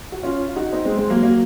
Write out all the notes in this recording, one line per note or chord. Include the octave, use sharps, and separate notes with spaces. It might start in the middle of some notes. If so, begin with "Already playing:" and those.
F#4
C#4 F4
F4
D#4 F#4
C4 D#4
G#3 C4
G#3 C4
F#3 A#3
F#3 A#3